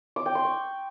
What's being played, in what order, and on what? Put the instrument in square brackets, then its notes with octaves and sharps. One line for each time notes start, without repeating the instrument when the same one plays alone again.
[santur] D6
G5
C6
C#6